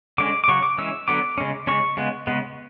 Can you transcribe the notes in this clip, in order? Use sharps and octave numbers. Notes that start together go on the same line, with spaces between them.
D3 G#3 C#4 D6
D6
C#3 F#3 C#6
D6
E3 G#3 C#4 E6
D3 F#3 B3 D6
C#3 G#3 C#4
C#3 G#3 C#4 C#6
C#3 G#3 B3
C#3 G#3 B3